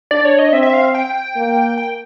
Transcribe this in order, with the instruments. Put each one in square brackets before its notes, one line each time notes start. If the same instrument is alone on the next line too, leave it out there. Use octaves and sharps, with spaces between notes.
[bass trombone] D4 [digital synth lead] D5
[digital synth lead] C#5
D#5
[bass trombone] C4 [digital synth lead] E5
[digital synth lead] E5
F5
G5
[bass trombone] A#3
[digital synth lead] G5